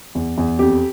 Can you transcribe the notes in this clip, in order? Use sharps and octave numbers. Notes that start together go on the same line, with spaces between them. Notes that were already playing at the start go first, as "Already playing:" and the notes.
E2
E2
F2 G4